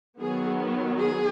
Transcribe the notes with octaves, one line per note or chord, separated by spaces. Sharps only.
D#3 F#3 B3 G#4
G#4